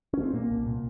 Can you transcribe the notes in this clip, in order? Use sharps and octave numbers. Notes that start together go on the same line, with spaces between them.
C#4
C4
A#2 A#3
C2
A#2